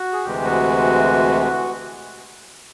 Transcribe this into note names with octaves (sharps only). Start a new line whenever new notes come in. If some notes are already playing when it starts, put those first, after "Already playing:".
Already playing: F#4
G#4
D2 C3 E3 G#3 G4
F#4
F#4